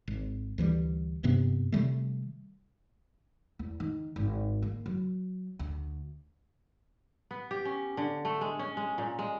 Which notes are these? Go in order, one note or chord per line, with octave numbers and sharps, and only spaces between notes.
G#1
D2 E3 F3 G3
F#1 G2 C3 B3
C3 D#3 G3 A3
E2
D#3
G#1
A#3
F#3
D2
B3
G4
C#4
D3
A3
G#3
C#4
G#3
A#2
G#3